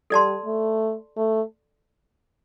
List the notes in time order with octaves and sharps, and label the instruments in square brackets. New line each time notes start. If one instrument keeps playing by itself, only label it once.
[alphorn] G3 [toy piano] A4 D5 A5 C6
[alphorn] A3
A3